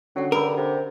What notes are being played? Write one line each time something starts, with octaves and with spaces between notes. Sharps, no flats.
D3 F#3 C#4 F#5
G2 A4 A#4 B5 E6
C3